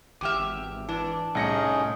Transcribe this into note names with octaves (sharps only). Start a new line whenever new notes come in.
G#1 E2 G4 E5 D6 F6
E3 D4
C2 A2 C#4 D#4 G#4 A#6 C#7